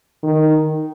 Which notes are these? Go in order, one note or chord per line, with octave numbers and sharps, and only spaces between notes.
D#3